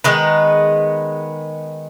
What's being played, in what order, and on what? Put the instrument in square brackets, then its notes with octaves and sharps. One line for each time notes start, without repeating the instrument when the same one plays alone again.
[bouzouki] D#3 G#3 B3 B4